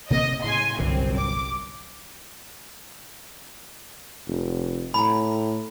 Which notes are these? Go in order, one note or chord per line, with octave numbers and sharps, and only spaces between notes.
C3 A#3 C4 D#5
A2 C#3 G#5 C6
G1 C2 F#2 A#2 D3 C4
D6
F1
A2 A#5 B5